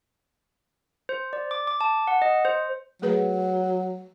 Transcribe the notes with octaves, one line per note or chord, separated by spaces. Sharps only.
C5
D5
D6
D6
A5
F#5
D#5
C5
F#3 A3 G#4 B4